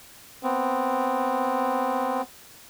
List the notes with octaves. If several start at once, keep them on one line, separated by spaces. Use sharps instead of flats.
B3 C4